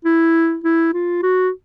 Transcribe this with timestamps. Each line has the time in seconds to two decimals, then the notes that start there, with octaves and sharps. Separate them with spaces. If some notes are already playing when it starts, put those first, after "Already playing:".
0.05 E4
0.64 E4
0.94 F4
1.23 F#4